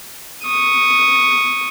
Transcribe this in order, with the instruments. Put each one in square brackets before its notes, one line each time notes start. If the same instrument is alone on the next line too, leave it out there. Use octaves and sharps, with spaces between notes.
[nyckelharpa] C#6 D#6